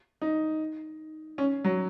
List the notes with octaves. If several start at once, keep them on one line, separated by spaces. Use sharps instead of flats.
D#4
C#4
F#3